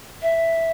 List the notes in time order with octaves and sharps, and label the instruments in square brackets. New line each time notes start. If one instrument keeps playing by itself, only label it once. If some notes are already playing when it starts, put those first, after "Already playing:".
[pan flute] E5